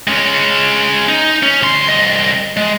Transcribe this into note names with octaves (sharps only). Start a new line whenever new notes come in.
G#3 C#4
D#4
C#4
D2 C6
C2 D#5
G#3